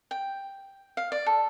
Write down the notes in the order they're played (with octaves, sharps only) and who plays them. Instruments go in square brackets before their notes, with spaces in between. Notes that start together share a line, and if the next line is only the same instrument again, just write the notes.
[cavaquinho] G5
F5
D5
A4